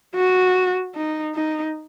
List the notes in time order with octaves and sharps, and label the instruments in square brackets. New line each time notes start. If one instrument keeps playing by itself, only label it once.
[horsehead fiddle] F#4
D#4
D#4